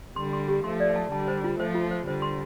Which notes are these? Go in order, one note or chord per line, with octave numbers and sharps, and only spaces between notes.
D3 G3 C6
C6
G4
F3 A3 C6
D5
A5
D3 G3 A5
C5
F4
F3 A3 C5
F4
C5
D3 G3 C5
C6